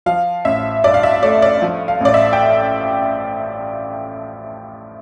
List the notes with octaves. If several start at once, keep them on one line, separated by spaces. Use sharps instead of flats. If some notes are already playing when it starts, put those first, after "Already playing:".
F3 F5
A1 E5
G2 D5
F5
E5
A3 D5
D5
F3
F5
A1 D5
E5
G5